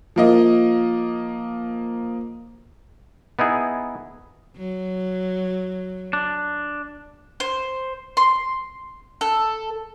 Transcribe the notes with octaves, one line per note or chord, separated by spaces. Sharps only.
F3 A#3 D#5
B3 D#4 E4 G#4
F#3
D4
C5
C6
A4